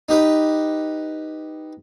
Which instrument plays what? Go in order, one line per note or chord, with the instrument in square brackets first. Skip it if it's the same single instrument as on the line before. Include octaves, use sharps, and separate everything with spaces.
[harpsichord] D#4 G4 B4